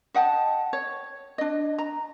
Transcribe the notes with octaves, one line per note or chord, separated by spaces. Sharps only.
D#5 F#5 G5 A5
C#5
D4 D#5
A#5